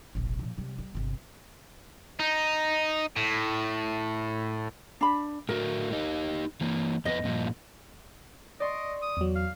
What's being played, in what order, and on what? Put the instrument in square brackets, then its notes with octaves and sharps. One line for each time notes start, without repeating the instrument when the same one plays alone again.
[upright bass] F1 A#1
A#2 F3
C3 G3
G3
G1 C3
[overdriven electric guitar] D#4
A2
[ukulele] D4 B5
[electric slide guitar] A2 A3 F#4 [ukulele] A#4
[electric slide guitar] D#4 G4 D#5
E3 A#3
[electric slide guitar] F2 B3 B4 [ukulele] D#5
[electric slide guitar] G2 A#2 F3
[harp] D5 C6 C#6 [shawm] D#5
[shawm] D#6
[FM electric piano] E2 F#3
[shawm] F5